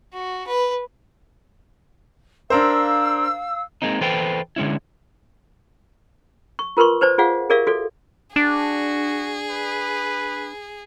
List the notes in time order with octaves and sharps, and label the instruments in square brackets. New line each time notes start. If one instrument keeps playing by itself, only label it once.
[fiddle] F#4
B4
[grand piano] D4 A#4 C5 [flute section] F5 E6
[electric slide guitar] G#3 A#3 C4 D#4
E3 A4 B4 C5 G5
D3 G#3 C#4 E4
[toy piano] C#6
F4 A#4 B4 C6 C#6
B4 C5 D5 A5
F4 G#4 D5 F5 F#5
G4 G#4 A#4 D5 E5 F5
F#4 A4 D5
[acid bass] D4 [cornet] F#4 [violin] G#4
[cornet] B4